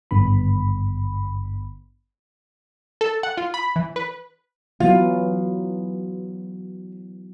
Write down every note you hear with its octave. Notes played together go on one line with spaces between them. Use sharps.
G#1 G2 D3 B3 B5
A4
F#5
F4
B5
E3
B4
E3 F#3 B3 F4